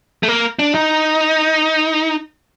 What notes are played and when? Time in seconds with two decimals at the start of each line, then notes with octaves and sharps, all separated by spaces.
0.23 A3
0.28 A#3
0.59 D4
0.75 D#4